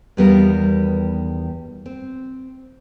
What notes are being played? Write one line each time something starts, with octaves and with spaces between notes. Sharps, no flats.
E2 D#3 G3 B3 F4 A#4
C4